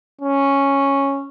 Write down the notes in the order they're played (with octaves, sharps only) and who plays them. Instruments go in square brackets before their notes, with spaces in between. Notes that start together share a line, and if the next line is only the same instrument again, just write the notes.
[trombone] C#4